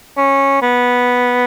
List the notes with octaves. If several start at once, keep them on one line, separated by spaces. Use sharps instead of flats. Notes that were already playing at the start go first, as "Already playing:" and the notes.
C#4
B3